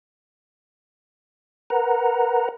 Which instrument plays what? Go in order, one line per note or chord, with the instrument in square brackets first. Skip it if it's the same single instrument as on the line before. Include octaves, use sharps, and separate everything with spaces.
[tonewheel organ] A#4 B4 F#5 A#5